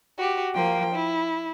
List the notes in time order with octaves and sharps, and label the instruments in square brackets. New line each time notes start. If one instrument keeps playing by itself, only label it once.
[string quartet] F#4 G4
F3 A#3 G5
E4